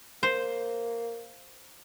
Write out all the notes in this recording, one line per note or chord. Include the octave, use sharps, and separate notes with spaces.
A#3 C5